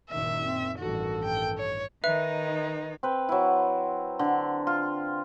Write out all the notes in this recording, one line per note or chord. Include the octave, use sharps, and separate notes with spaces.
F#1 A#2 D#3 E5
C4
A1 G2 D#3 F#4 A4
G5
C#5
D#3 D#4 B4 E5
C4 B4
F#3 E4
D3
F4